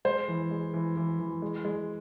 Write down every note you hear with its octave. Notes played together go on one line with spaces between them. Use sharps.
G#3 C5
E3
G#3
E3
E3
E3
G#3
G#3